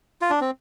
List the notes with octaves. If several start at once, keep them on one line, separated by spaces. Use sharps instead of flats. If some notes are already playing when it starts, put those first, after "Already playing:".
F4
D4
C4